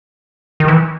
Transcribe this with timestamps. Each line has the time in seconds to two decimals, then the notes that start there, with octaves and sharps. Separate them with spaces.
0.60 D#3
0.68 E3